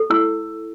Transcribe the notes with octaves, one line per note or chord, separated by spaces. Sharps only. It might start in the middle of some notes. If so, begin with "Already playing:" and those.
Already playing: A4
E4 E6